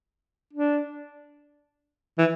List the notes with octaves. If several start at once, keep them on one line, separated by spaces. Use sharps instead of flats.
D4
E3